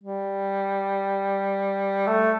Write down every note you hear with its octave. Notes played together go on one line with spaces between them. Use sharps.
G3
A3